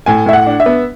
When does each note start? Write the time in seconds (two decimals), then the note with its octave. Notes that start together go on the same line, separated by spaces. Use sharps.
0.06 A2 G#5
0.26 A2 E5
0.33 F#5
0.46 D4
0.60 E5
0.66 B3